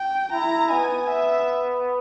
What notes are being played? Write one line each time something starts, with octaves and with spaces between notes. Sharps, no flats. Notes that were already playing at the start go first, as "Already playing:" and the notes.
Already playing: G5
E4 A#5
B3 G#5
E5